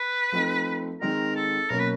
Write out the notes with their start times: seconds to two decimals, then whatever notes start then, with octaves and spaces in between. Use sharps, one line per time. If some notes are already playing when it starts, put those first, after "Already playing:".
Already playing: B4
0.32 F3 A3 C4 D#4
1.01 D#3 G#3 C4 D#4 A#4
1.36 A4
1.70 B2 F#3 A#3 C#4 A#4
1.79 B4